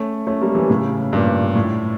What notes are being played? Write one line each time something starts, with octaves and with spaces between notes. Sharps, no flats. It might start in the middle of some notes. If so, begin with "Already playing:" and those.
Already playing: A3 C#4
A3 C#4
G3 A#3
E3 G3
A2 C#3
G2 A#2
A2